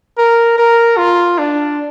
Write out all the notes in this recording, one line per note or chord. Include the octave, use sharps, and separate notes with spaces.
A#4
A#4
F4
D4